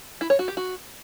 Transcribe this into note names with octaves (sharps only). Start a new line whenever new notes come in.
E4
C#5
F#4
G4
F#4